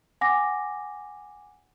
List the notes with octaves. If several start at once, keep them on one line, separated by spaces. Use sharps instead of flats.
F#5 G#5 D6 A#6